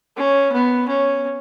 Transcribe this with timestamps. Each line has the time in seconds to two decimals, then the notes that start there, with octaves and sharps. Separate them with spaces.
0.17 C#4
0.52 B3
0.89 C#4